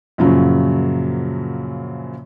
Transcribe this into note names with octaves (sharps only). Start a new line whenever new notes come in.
F#2 A#2 C#3 F3 F#3